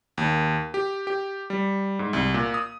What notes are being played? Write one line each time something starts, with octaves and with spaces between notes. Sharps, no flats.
D#2
G4
G4
G3
G#2
C2
A#2
D#6